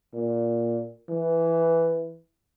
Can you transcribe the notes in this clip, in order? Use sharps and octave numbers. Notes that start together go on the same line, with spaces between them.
A#2
E3